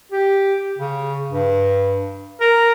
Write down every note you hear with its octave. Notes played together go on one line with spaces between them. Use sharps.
G4
C#3
G2
A#4